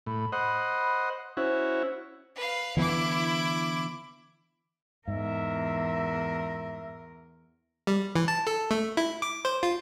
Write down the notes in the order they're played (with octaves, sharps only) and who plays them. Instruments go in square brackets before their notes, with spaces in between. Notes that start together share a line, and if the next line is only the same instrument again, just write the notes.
[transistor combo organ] A2 [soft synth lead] B5
[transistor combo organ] C5 D#5 F#5 [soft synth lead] B5
[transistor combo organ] C#4 E4 F#4 [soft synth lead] C5
[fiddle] B4 F5
[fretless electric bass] D3 E3 B3 [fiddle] E4 D6
[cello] E2 A#4 [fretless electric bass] G#2 [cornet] E5
[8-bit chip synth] G3
E3
A5
A4
A3
E4
D6
C5
F4